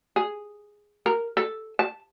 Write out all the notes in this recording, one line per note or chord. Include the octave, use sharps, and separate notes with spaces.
G#4
A#4
A4
A5